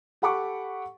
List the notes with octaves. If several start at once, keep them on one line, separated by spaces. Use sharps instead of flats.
G4 A4 F#5 B5 C#6 D6